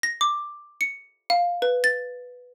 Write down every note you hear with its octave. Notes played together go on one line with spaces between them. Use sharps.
A#6
D6
C#7
F5
B4
A6